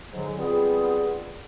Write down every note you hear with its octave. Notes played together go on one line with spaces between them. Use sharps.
G#2 D3 F#3
G3 B3 C4 F4 G#4